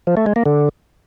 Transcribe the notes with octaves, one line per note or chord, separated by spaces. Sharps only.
F3
A3
G#3
A#3
D3